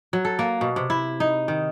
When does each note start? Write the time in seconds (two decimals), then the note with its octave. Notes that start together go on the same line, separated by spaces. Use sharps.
0.13 F#3
0.25 A4
0.39 A#3
0.61 B2
0.76 C3
0.90 E4
1.20 D#4
1.48 D#3